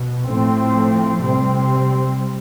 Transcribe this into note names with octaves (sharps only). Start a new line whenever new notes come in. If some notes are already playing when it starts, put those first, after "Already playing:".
Already playing: B2
A2 F3 A3 C4
C3 G3 C4